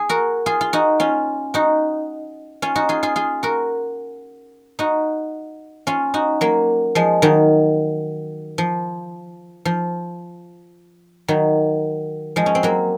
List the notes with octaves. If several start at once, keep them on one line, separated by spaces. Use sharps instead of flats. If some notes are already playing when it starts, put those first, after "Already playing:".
Already playing: G#4
F#4 A#4
F4 G#4
F4
D#4 F#4
C#4 F4
D#4 F#4
C#4 F4
D#4 F#4
F4 G#4
F4 G#4
F4 G#4
F#4 A#4
D#4 F#4
C#4 F4
D#4 F#4
F#3 A#3
F3 G#3
D#3 F#3
F3
F3
D#3 F#3
F3 G#3
C#4
C4
F#3 A#3